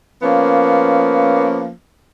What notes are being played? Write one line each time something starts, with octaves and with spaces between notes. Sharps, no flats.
F3 A#3 B3 C#4